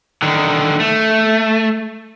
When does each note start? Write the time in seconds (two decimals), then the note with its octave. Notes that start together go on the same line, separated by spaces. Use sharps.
0.22 D3 D#3
0.80 A3